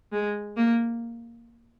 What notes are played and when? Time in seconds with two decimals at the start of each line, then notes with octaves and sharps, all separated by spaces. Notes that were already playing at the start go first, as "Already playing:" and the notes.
0.12 G#3
0.57 A#3